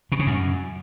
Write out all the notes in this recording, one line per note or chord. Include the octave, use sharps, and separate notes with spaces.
B2
C#3
F#2